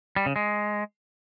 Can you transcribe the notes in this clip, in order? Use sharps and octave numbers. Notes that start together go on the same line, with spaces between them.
G3
C#3
G#3